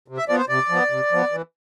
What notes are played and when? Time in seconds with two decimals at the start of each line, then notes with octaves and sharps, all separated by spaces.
0.08 C3
0.17 E5
0.28 F3 D5
0.31 B3
0.38 C5
0.49 C3 D5
0.69 F3 B3
0.91 C3
1.12 F3 B3
1.32 E3